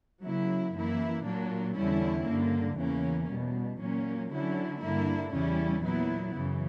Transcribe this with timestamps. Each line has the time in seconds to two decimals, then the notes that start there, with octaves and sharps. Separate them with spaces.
0.22 C#3 F#3 A#3 E4
0.73 F#2 E3 A#3 E4
1.24 A#2 F#3 A#3 D4
1.75 E2 D3 G3 C#4 E4
2.26 G2 D3 A#3
2.77 E2 C#3 E3 A#3 C#4
3.29 E2 B2 G3
3.80 A#2 F#3 A#3 C#4
4.30 D3 F#3 C#4 E4
4.81 G2 D3 A#3 E4
5.32 E2 C#3 G3 C#4 E4
5.84 A#2 F#3 B3 E4
6.34 F#2 C#3 E3